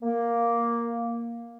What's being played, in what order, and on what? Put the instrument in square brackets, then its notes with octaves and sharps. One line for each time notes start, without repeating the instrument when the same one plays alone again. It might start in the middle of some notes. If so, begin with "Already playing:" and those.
[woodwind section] A#3